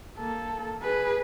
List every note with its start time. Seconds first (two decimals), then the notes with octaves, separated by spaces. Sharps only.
0.18 A#3 A4
0.82 G#4 B4